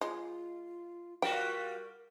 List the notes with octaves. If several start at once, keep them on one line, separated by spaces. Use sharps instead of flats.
G#3 F4
G3 F4 F#4 A#4 G5